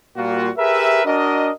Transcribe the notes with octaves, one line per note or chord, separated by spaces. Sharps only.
A#2 G3 A#3 F4 F#4
G4 G#4 A#4 B4 E5
D4 F#4 A#4 D#5